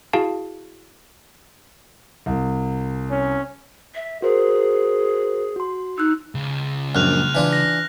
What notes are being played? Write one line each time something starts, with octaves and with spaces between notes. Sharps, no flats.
E4 F#4 G#4 F5 A5
C2
C#4
E5
F#4 G#4 A#4 C5
F#4 C6
D#4 E6 F#6
C#2
A#1 F#2 F6 F#6 F7
E3 D4 F4
A#6